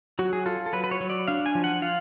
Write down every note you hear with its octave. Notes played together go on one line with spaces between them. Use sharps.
F#3 F#4
G#4
F4 A4
A4
F#3 B4
B4
C#5
F#3
D5
D4 F5
G#5
F3
F#5
F4 F5